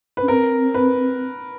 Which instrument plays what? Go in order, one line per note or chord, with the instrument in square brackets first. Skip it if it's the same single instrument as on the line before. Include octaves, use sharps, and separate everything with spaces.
[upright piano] B4
[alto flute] C#4
[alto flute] C4 [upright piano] A#4
[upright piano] B4